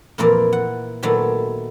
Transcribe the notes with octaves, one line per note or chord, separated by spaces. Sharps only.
F2 A#2 E3 A#3 A#4 D5
F#5
A#2 D#3 F#3 A3 B3 D5